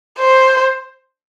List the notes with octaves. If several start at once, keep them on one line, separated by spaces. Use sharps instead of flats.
C5